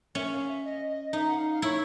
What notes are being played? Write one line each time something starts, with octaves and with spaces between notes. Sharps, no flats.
C#4 E5
F5
E5
D#5
D#5
D#4 E5
F#5
F5
F5
E4 C#5